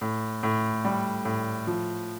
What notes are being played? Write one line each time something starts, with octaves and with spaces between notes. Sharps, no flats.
A2
A2
G3
A2
F3